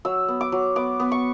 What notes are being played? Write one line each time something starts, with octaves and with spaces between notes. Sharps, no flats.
F#3 E6
B3
D6
F#3
B3 D6
B3
C#6